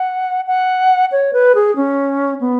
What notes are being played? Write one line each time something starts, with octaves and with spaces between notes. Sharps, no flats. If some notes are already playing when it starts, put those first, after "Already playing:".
Already playing: F#5
F#5
C#5
B4
G#4
C#4
B3